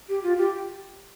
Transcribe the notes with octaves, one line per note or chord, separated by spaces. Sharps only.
G4
F4
G4